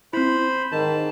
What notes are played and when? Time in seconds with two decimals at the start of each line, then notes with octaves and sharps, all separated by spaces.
0.13 C4 E4 C5 B5
0.72 G#2 D#3 A5